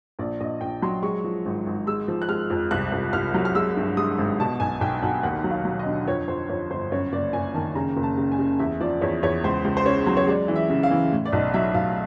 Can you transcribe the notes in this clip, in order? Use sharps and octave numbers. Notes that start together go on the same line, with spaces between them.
A#1 D5
A#1 D#5
A#1 G5
F#3 C6
G#3 C#6
F3
G#1
G#1
G#3 E6
F3
F#6
G#3 F6
F2
C2 F#6
C2
C2 F6
F#3
F6
G#3 E6
G2
G#3 D#6
G#1
B2 A5
B1 G#5
B1 G5
B1 F#5
D#2 F#5
F#3
F5
F#3
D#5
D3
F2 C#5
F2 C5
F2 C#5
G1 C5
F#2 C#5
F#1 D5
F#1 G#5
D#3 A5
C#3 A#5
F#1
A5
C#3
G#5
C#3
E2 E5
F3 D5
E2 C#5
E2 C#5
C#2 C5
C#2
C5
C#3 C#5
F#3
C#5
G#3 D5
E3
E5
C#3
F5
E3
A2
D5
B1 D#5
F#3 E5
B1 F5